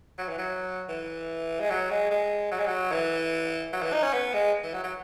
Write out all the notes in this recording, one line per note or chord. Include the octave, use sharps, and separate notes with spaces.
F#3
E3
F#3
E3
G#3
F#3
G#3
G#3
F#3
G#3
F#3
E3
F#3
E3
D#4
C#4
B3
G#3
E3
F#3
F#3